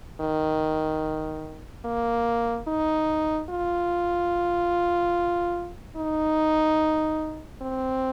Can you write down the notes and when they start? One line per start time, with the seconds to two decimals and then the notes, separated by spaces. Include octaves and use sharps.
0.20 D#3
1.85 A#3
2.68 D#4
3.49 F4
5.96 D#4
7.61 C4